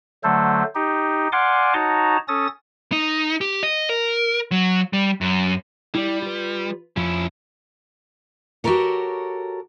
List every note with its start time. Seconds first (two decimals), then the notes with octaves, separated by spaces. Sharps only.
0.24 D3 F#3 A3 A4 C5
0.75 D#4 G4
1.32 D5 F5 F#5 G#5 C6 D6
1.74 D#4 F#4 C#5 A5 A#5
2.28 C#4 A4 D#6 A6
2.92 D#4
3.41 G4
3.63 D#5
3.89 A#4
4.52 F#3
4.93 G3
5.21 F#2
5.95 G3 E4 G4 D5
6.22 F4 B4
6.97 F2 F3 C#4 E4
8.64 F#4 G4 A4 A#4 C#5